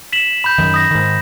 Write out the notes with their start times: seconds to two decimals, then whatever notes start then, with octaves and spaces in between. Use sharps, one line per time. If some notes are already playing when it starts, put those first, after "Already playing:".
0.12 B6 E7 F#7
0.44 B5 G6
0.58 F#2 D#3
0.74 D#6 A#6
0.91 G#2 D#3